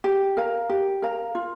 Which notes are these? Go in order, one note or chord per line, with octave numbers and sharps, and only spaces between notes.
G4
A#4 F5 A#5
G4
A#4 F5 A#5
F4